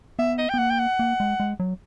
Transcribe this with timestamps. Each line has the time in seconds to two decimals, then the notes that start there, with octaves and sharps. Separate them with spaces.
0.19 B3 E5
0.38 D#5
0.49 B3 G5
0.58 A#3 F#5
0.70 G5
0.79 F#5
0.99 A#3
1.20 G#3
1.40 G#3
1.60 F#3